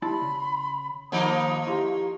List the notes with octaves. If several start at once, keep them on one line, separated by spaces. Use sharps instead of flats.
G3 E4 A5 B5 C6
C#3
D#2 F3 A#3 D#4 B5 D#6
E4 G4 A#5 C6 C#6